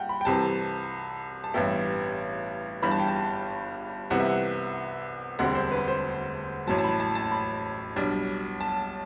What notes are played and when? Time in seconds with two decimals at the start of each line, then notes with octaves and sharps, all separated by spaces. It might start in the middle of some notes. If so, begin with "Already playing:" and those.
Already playing: G2 F#5 G5
0.09 B5
0.21 G5
0.25 C2 C3 E3 A5
1.44 A5
1.54 A1 G2 E3 B3 E4 G5
2.82 G1 G2 E3 B5
2.91 A5
3.00 G5
3.08 A5
4.10 C2 C3 E3 B3 F#5
4.20 E5
4.29 F#5
5.39 E1 D2 D3 G3 C4 F#5
5.55 C5
5.72 B4
5.88 C5
6.67 A1 A2 F#3 A5
6.78 A5
6.84 B5
7.00 A5
7.15 A5
7.32 B5
7.96 B1 B2 G3 D4
8.61 A5